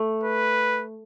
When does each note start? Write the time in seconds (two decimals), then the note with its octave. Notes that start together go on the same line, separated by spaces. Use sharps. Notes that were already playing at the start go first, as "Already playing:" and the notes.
Already playing: A3
0.23 B4